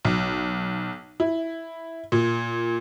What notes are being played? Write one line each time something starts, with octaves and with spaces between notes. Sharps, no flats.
B1
E4
A#2